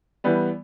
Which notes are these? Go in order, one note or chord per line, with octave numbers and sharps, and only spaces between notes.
E3 G3 B3